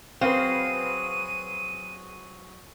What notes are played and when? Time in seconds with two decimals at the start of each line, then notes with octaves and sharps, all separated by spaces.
0.21 F#3 C4 F#4 G#4 B4 F5 D#7